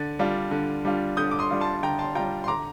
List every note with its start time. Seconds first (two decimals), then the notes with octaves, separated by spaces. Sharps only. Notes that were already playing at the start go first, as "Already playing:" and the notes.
Already playing: D3 A6
0.19 G3 D4 F4
0.51 D3
0.85 G3 D4 F4
1.17 D3 D#6 G6
1.31 D6
1.39 C6 D#6
1.51 G3 D4 F4
1.61 A5 C6
1.83 D3 G5 A#5
1.99 A5 C6
2.15 G3 D4 F4 G5 A#5
2.44 C6
2.48 D3 A#5 D6